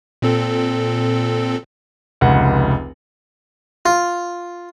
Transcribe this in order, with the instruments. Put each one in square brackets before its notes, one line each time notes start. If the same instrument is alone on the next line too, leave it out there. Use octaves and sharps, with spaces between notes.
[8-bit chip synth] A#2 C4 A4
[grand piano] F1 C#2 F#5
[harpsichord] F4